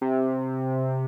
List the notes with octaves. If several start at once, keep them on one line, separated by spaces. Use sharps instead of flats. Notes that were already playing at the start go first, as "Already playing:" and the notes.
C3